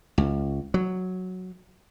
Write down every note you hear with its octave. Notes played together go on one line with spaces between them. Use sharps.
C#2
F#3